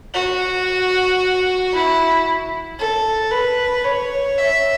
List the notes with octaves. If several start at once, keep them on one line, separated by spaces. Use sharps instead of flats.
F#4
E4
A4
B4
C#5
E5